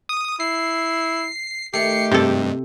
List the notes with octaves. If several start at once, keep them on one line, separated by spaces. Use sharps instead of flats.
D#6
E4 C7
D#3 A3 G4 C7 C#7
G2 C3 A4